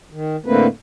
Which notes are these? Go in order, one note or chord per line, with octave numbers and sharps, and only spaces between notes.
D#3
A2 D3 A3 A#3 C4 B4